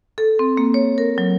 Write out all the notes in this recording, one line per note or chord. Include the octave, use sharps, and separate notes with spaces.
A4
C4
A#3
C#5
A#4
F#3